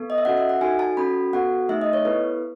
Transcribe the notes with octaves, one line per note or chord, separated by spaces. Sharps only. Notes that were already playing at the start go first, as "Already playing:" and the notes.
Already playing: B3 A4
D#5
E5
C#4 F#4 A4 F#5
E5
F#5
D#4 F#4 A4 G#5
A5
C#4 F#4 A4 B5
B3 F#4 A4 F#5
A3 D#4 G#4 E5
D#5
C#5
B3 E4 A4 B4